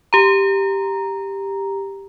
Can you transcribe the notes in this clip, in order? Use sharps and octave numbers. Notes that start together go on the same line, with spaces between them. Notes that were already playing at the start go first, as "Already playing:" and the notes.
G4 A#5